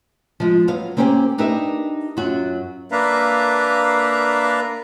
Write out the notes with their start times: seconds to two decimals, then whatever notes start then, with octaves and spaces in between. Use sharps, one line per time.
0.40 F3 G#3
0.68 F#3 B3 F5
0.97 A#3 C4 C#4 D#4 G4 G#4
1.38 D4 D#4 G4 A#4 B4 E5
2.17 F#2 F#3 F4 F#4
2.91 A#3 D4 A#4 B4 E5 F5